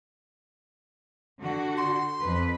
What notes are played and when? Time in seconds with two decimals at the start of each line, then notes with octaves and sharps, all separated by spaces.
1.41 D3 F#4
1.77 C6
2.23 F2 B4